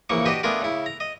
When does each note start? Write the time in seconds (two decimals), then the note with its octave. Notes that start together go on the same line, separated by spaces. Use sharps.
0.10 A#1 C#3 E3 A#3 C#6
0.25 D4 F#4 G4 B4 D#5
0.43 A3 B3 D4 F4 G#4 A#4
0.61 C#3 E4
0.86 A#5
1.00 D#5